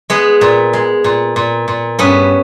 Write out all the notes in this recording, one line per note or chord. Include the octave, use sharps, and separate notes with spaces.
G#3 B3
A#2
G#3
A#2
A#2
A#2
G2 B3 C#4